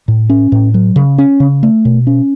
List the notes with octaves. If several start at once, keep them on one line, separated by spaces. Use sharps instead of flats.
A2
C#4
A2
F#3
C#3
C#4
C#3
A3
B2
C#4